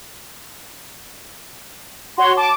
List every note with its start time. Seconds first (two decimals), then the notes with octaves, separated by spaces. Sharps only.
2.18 F#4 C#5 C6
2.37 A5 D6